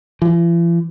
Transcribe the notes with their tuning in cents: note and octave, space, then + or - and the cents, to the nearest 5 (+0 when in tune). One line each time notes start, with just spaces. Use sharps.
E3 +45